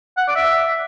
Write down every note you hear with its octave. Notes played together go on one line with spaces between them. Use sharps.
F#5
D5
E5